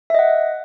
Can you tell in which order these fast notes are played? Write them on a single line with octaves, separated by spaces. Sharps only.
E5 D#5 F#5